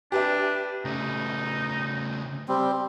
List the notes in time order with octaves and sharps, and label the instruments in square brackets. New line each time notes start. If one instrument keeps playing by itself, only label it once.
[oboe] D4 [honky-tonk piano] G4 B4 E5
[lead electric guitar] C#3 A3 [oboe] D#4
[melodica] G3 C4